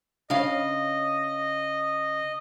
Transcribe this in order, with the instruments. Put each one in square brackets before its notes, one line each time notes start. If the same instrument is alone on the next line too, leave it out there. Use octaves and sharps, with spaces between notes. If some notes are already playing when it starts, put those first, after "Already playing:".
[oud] C#3 F5 [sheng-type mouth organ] D#5